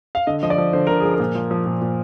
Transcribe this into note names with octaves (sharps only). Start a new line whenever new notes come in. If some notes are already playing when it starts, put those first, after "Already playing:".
F5
D3 D#5
F3 D#5
D5
F3
D3 C5
D3 A#4
F3 G#4
A#4
A#2
F3
F3
A#2
A#2